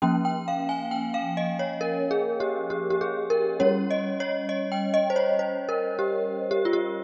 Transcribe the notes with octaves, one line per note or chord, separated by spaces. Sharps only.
F3 A#3 C#4 G5
G5
F5
G#5
G5
F5
D#5
C#5
A#4
G#4
G4
G4
G4
G#4
A#4
G3 C#4 C#5
D#5
C#5
D#5
G5
D#5
C5
C#5
C5
A#4
G4
G4
F4
G4